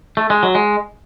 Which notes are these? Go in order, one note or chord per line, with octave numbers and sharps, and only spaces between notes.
A3
G#3
F#3
G#3